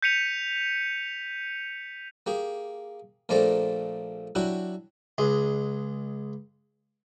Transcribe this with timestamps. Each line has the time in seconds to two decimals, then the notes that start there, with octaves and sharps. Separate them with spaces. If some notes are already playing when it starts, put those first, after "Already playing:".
0.02 G6 B6 C#7 D#7 F7
2.26 A#3 G4 G#4
3.29 A#1 A3 A#3 C4 D5 A#5
4.35 F#3 D4 E4 F#4 G4
5.18 C#2 G#3